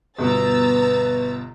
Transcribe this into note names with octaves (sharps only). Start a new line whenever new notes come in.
G1 B2 B4 A#5 E6 A6